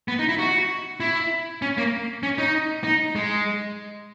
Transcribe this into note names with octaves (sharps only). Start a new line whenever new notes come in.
B3
D#4
E4
F#4
E4
C#4
A#3
C#4
D#4
D#4
G#3